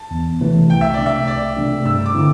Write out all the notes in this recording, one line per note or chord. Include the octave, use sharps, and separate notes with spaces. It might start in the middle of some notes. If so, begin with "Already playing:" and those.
Already playing: A5
E2
C3 E3 A3
C2 G5
E5
C3 A3 D4 D5
E5
C2 D5
C3 A3 D4
G2 E6
D6
D3 C4 E4